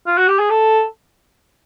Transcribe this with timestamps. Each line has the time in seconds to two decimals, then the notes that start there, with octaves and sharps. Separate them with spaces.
0.07 F4
0.18 F#4
0.28 G4
0.39 G#4
0.50 A4